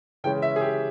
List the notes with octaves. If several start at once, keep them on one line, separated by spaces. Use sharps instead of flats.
C#3 E3 G#3 C#4 G5
E5
G#4
G4